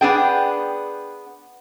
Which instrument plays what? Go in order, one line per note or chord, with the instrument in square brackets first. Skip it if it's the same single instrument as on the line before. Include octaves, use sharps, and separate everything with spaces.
[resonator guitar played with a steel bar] B3 D4 G#4 G5